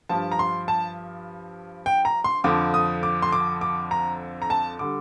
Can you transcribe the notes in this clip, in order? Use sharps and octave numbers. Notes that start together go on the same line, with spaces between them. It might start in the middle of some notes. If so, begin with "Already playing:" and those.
G2 F3 A5
A#5
C6
A5
G5
A#5
C6
F2 D3 F3 D6
D#6
D6
C6
D6
D6
A#5
A#5
A5
D3 G3 D6